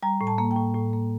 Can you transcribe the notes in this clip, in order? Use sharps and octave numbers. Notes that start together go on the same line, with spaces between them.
G3 A#5
A2
A5
A#3
G5
A2
A2
A#3